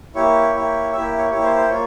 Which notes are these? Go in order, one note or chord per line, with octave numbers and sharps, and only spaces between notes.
A#3 E4 G4 C#5
A#3 E4 G4
A#3 E4 G4 E5
C#5
A#3 E4 G4 C#5
C5
C5
A#3 F4 C#5